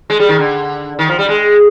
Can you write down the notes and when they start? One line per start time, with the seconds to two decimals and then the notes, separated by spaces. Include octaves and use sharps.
0.10 G#3
0.20 G3
0.29 D#3
0.39 D3
0.99 D#3
1.09 F3
1.19 G3
1.29 G#3